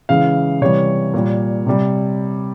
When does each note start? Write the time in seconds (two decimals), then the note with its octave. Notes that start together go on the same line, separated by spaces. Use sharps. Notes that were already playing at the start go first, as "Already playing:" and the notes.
0.09 C#3 E3 G#3 F5
0.61 C3 E3 G3 C#5
1.14 A#2 G3
1.66 C3 G3